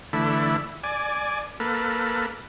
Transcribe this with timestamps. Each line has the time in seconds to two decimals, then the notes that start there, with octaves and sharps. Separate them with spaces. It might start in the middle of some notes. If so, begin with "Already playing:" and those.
0.13 D3 E3 A3 E4
0.84 D5 G#5
1.60 A#3 A4 B4